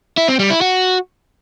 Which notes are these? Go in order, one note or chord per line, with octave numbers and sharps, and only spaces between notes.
E4
C4
G3
E4
F#4